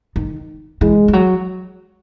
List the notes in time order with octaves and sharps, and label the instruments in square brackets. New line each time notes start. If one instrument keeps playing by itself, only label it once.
[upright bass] D#3
[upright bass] E3 [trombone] G#3
[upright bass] F3
F#3